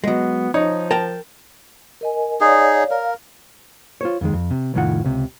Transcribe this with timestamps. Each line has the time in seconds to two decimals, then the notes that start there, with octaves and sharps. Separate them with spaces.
0.04 F#3 G#3 B3
0.54 F3 D#4 C#5
0.91 A#4 G5 A5
2.01 A#4 D#5 G#5
2.41 D#4 G#4 C#5 D5 F5
2.91 A#4 F5
4.01 F4 C5 C#5
4.21 F2 D#3 G#3
4.33 F2
4.51 C3
4.74 C2 F2 A2 D#3 F4 F#5
5.04 C#2 C3